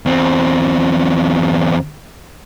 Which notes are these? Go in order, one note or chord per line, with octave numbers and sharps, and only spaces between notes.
E2 C4